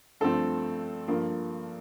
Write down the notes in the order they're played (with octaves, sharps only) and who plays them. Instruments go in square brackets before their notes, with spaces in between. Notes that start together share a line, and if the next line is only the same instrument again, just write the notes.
[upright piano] G2 F3 A3 C4 A4
G2 F3 A#3